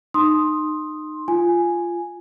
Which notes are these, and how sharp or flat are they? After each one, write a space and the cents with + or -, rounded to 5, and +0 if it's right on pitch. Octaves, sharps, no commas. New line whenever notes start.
D#4 -25 C6 +10 D#6 +0
F4 -10 G#5 +0